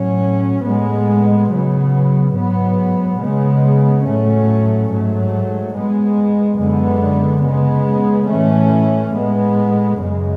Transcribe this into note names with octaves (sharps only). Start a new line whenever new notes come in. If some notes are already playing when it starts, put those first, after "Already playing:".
Already playing: A2 F#3 C#4
A2 G#3 B3
C#3 F#3 B3
G#2 F#3 B3
C#3 G#3 B3
A2 F#3 A3 C#4
G#2 F#3 A3
G#2 G#3 B3
F#2 D3 G#3 B3
C#3 G#3 B3
A2 E3 A3 C#4
A2 G#3 B3
F#2 C#3 G#3